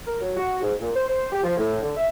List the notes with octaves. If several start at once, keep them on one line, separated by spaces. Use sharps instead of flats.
A#4
F#3
F#4
G#2
A#2
C5
C5
G4
F3
A2
D3
E5